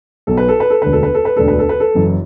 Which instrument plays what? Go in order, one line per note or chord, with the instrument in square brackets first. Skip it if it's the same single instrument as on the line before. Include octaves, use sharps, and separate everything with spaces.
[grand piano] B1 B2 A4
B4
A4
B4
A4
E1 D2 D3 B4
A4
B4
A4
B4
E1 D2 D3 A4
B4
A4
B4
A4
F#1 F#2 E3